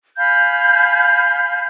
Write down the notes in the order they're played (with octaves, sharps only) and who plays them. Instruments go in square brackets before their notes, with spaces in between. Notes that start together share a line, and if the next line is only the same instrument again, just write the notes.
[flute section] F5 G#5 B5 G6